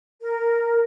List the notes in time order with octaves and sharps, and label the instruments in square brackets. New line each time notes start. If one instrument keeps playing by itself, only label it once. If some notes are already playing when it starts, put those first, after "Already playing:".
[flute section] A#4